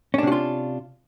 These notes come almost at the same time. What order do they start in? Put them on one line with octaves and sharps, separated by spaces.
C#4 D4 C3 F#4 F4